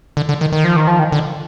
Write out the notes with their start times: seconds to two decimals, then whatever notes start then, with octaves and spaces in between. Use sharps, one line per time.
0.17 D3
0.29 D3
0.41 D#3
0.52 D#3
0.64 F3
0.76 D#3
0.87 F3
0.99 D#3
1.12 D3